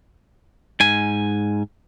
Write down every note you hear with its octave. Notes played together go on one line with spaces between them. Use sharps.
G#2 G#5